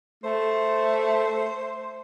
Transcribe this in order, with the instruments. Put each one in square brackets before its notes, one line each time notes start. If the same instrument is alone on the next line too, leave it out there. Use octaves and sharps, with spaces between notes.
[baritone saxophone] A3 [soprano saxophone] C5